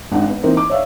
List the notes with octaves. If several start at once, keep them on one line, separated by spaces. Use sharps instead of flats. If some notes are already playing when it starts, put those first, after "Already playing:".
G#1 D4 D#4 F#5
B3
E3 A#3 C4 D#4
D6
C#5 D5 E5 F5